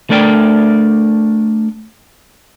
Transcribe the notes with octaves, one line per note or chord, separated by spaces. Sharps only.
A3 D4 A#4 D5 G5